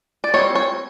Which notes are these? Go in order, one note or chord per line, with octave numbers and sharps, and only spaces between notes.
D5
G3 C4 D#4 C#5
C#5